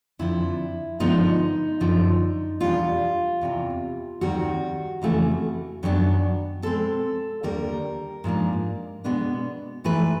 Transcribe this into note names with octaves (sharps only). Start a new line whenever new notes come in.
F2 D3 F3 E4
G2 D3 F3 G#3 B3 D#4
F#2 D3 F3
E2 B2 G3 B3 D4 F4
E2 C3 E3
D#2 D#3 G3 C4 F#4
F2 C#3 E3 A3
F#2 D#3 F#3 B3 D4
B2 G#3 C4 A4
D#2 D3 G3 A#3 A#4
G#2 F3 A#3 D4
B2 G#3 B3 D4
G#2 E3 A3 B4